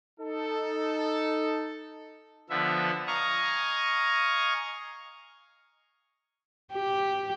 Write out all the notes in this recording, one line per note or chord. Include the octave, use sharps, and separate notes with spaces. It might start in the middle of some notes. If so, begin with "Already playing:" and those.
D#4 A4
D3 F3 B3 E5
D#5 F5 G#5 A#5 C#6
G4